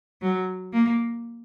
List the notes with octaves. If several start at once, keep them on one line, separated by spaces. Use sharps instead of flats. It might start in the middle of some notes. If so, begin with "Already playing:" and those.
F#3
A#3